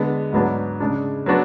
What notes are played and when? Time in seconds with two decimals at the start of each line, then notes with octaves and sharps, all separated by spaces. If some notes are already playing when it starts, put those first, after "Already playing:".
Already playing: D3 G#3 B3
0.33 G#2 F#3 B3 D4
0.80 C#3 G#3 D4
1.26 F#3 B3 D4 F#4